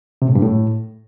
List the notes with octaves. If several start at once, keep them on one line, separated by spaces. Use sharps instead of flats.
C3
A2
G2
A2